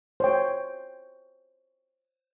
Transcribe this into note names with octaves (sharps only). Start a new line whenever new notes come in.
C5 C#5 G5